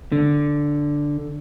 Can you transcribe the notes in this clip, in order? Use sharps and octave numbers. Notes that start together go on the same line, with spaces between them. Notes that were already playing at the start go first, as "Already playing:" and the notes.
D3